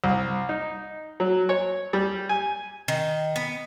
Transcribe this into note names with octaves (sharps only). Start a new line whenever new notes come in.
C2
D#4
F#3
C#5
G3
G#5
D#3
B3